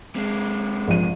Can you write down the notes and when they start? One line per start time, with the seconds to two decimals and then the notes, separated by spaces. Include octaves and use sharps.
0.16 C3 G#3
0.88 A#1 D#7